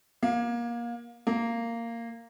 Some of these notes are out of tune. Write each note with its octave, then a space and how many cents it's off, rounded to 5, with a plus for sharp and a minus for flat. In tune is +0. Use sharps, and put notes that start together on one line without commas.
A#3 +25
A#3 -10